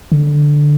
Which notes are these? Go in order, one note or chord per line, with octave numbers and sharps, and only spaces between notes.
D3